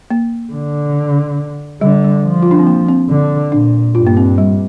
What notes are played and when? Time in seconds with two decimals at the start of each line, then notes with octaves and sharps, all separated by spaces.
0.11 A#3
0.53 D3
1.81 D3 G3
2.04 G3
2.24 F3
2.43 F4
2.51 D4
2.59 C4
2.67 A#3
2.88 C4
3.10 D3
3.52 A#2 D4
3.95 G2 F4
4.07 A#3
4.17 C4
4.38 G3